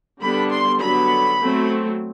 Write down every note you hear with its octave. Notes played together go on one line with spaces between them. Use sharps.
D3 G3 B3 D4 B5
C6
D3 F#3 B3 B5
F#3 A3 C4